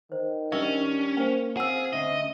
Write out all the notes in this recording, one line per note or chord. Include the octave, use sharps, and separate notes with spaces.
D#3 C5
G3 C#4 D4 A#4 E5
A#3 C5 G5
C4 G#4 C5 F5 F#5 E6
D2 C#4 D#5 E5